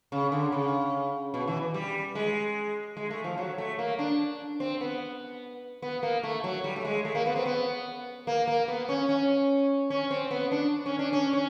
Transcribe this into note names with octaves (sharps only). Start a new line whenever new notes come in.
C#3
D3
C#3
B2
E3
G3
G#3
G#3
A3
F3
F#3
A3
A#3
D4
C4
B3
B3
A#3
A3
F#3
G3
A3
G#3
A3
A#3
B3
C4
B3
A#3
A#3
B3
C#4
C#4
C#4
C4
B3
D4
C#4
D4
C#4
C#4